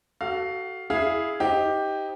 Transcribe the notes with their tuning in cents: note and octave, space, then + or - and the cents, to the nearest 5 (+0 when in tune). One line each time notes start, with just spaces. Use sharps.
F#4 +25 A4 +0 F5 +5
E4 +0 G#4 +0 F5 +0
D#4 +20 G4 +0 C5 +0